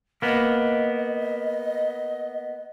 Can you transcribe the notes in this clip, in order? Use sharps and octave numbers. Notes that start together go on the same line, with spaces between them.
A#3 B3 D#5